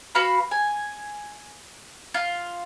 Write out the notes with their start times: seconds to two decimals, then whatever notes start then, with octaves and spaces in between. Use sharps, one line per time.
0.15 F#4 B4 F5 B5
0.51 G#5
2.14 F4